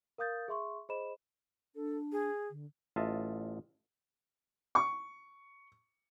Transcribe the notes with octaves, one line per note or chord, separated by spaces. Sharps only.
A#4 F5 D#6 G6 A6
G#4 E5 C6 C#6
G#4 C5 D#5 B5 E7
D4 A4
G#4
D3
A1 F4 D#5 E5 A5
C#6